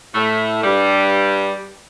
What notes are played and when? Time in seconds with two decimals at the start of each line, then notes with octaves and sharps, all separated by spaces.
0.15 A2 A3
0.64 G2 G3